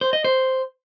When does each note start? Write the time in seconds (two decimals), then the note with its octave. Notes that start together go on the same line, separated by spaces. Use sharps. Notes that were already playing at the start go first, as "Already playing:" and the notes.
0.01 C5
0.13 D#5
0.24 C5